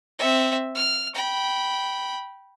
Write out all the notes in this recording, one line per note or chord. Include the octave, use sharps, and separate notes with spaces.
C4 E5
F6
G5 B5